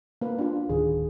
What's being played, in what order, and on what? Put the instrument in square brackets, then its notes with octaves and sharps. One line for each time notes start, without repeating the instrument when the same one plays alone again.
[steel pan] A#3 B4
D4 F4
[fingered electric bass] D1 D#3 [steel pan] G#4